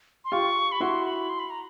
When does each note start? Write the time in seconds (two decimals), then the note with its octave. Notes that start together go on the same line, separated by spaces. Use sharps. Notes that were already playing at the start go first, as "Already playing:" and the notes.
0.25 C6
0.32 F4 G4 C#6
0.72 B5
0.80 E4 F#4 C6
1.06 B5
1.29 C6
1.39 B5
1.50 A#5